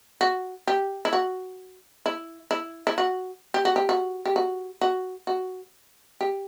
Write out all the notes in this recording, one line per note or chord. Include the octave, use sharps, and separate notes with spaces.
F#4
G4
E4
F#4
E4
E4
E4
F#4
G4
F#4
G4
F#4
G4
F#4
F#4
F#4
G4